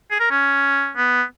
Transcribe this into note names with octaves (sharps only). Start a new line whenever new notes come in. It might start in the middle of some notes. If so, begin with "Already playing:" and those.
G#4
A#4
C#4
B3